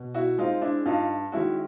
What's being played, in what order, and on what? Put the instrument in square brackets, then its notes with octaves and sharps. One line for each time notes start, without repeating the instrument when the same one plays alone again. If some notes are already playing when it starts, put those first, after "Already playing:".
Already playing: [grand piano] B2
[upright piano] E4 F#4
[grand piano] G#3 C4 [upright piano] D#4 F4
[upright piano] D4 E4
[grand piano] G2 [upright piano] D#4 F4
[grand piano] D#3 G#3 C#4 [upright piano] E4 F#4